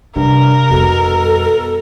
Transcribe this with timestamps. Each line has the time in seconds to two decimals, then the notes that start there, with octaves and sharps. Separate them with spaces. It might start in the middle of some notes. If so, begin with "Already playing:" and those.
0.16 G2 C3 A#4
0.70 F2 B2 G3 A4